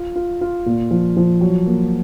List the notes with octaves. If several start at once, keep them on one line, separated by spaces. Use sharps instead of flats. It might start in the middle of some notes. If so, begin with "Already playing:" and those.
Already playing: F4
F4
F4
A#2
F3
F3
F#3
A#3